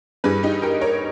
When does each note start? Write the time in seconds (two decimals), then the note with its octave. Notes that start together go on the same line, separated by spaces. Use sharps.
0.24 G2 E3 G3 G#4 B4
0.43 D#4 G4
0.62 G4 A#4
0.81 A#4 C#5